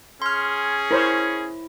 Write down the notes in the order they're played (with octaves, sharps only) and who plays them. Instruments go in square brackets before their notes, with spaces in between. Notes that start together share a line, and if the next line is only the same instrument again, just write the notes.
[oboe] C#4 [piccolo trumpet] G#4 [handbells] C6 F6
[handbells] E4 [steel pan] A#4 C5 C#5